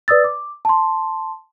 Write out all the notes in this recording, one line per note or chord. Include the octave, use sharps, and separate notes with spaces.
B4 D5 D#6 E6 A6
D6
A5 C6